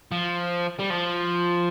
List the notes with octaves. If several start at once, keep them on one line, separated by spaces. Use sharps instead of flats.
F3
G3
F3